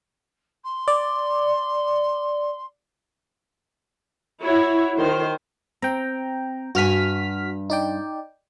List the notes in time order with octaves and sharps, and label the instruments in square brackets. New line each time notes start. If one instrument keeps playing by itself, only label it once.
[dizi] C6
[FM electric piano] D5
[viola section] E4 F#4 C#5
D#3 A#4 C5
[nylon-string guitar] C4 [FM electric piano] G5 A#5
[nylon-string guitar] G2 G#5 [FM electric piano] F#4 F6 B6
[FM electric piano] D#4 D5 G5